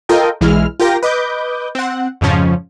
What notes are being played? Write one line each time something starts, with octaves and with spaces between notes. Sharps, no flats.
F4 A4 A#4 D#5 G5
B1 E3 G#3 E4 F6
F4 G4 A#4 G5 A#6
B4 D#5 D6 G6
C4 F#5
F2 G#2 C#3 F3 C#4